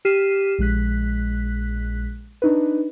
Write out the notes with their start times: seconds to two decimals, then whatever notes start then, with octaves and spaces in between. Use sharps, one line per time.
0.05 G4 F6 B6 C7 D#7 E7
0.59 A#1 G#3 F#6 B6
2.42 D4 D#4 B4